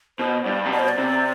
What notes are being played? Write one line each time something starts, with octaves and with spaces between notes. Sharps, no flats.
B2 C5
G2 D5
C3
B2 D5
C5
D5
C3